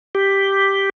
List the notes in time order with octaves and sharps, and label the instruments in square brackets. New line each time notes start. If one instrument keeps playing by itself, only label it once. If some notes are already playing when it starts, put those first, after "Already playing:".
[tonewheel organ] G4